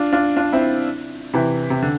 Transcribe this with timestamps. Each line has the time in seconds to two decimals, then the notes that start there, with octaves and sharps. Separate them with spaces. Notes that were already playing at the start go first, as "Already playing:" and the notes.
Already playing: D4 F4
0.13 D4 F4
0.37 D4 F4
0.53 C4 E4
1.34 C3 E3
1.70 C3
1.82 D3